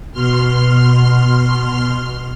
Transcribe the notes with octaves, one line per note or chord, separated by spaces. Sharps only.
B2 C6 F6